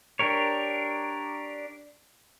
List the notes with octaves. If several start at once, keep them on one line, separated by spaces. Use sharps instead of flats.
D4 G4 A#4 C#5